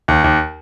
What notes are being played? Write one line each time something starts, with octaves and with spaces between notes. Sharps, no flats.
D#2
D#2